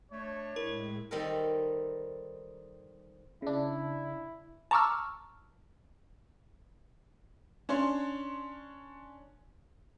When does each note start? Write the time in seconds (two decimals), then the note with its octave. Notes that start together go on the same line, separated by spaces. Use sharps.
0.12 A3 D4 C#5 D5
0.56 A2 G#3 E4 A#4
1.11 D#3 G3 C4 D#4 A4 A#4
3.42 C#3 D4 E4
4.71 A5 A#5 C#6 D6 E6 F6
7.69 C#4 D4 C#5 C6